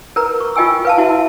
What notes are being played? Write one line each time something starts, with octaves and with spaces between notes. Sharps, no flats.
A#4 B4 A#5
C#6
F4 D#5 G5 G#5 E6
B4 F5 A5
E4 F#4 E5